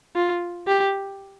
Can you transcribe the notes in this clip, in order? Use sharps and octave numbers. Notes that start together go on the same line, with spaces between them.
F4
G4